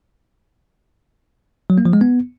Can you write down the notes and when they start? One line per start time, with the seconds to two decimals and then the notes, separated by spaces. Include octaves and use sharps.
1.70 F#3
1.78 A#3
1.85 F3
1.93 G#3
2.01 B3